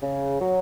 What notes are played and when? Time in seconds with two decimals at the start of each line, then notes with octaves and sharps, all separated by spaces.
0.03 C#3
0.41 F#3